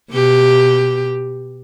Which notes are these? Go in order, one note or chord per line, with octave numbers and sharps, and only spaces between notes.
B2 G4